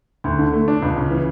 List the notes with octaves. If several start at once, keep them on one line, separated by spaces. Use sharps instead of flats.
D2
D3
A3
D4
C#2
C#3
E3